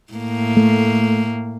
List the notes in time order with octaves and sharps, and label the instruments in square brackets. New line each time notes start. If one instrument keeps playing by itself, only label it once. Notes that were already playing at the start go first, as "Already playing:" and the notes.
[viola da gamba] A2 A#3
[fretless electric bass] A3